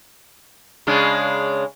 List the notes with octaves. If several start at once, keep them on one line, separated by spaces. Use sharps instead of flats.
C#3 G#3 D4